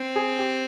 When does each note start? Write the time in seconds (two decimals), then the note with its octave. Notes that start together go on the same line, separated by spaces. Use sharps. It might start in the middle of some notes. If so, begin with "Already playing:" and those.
Already playing: C4
0.16 G#4
0.39 G4